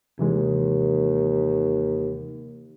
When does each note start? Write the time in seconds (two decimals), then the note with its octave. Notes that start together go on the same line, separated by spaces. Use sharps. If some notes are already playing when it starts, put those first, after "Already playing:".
0.19 D#2 C3 E3 G#3